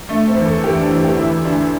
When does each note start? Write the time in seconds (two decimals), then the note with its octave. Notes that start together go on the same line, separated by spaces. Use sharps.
0.09 D3 A3
0.28 C4
0.37 E2
0.45 A4
0.64 E2 G4
0.77 D4
0.90 E2 E4
1.04 G4
1.17 D2 E4
1.45 D2 D4